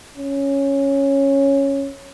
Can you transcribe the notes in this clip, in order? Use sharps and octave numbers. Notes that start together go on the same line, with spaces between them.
C#4